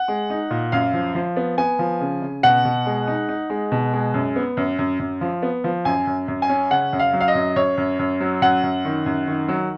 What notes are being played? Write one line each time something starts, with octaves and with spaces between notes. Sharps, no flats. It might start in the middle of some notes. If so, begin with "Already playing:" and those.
Already playing: F#5
G#3
D#4
A#2
F#2 F5
F3
F3
B3
B3 G#5
F3
C#3
C#3
B2 F#5
B2
G#3
D#4
D#4
G#3
B2
G#3
F#2
B3
F#2
F#2
F#2
F3
B3
F3
F#2 G#5
F#2
F#2
G#5
C#4
C#3 F#5
F#2
F5
F#3
F5
D#5
F#2
F#2 C#5
F#2
F#2
F#3
F#2 F#5
F#2
D#3
F#2
D#3
F#3